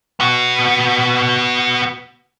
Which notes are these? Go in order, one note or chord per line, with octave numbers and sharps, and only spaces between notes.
B3 F#4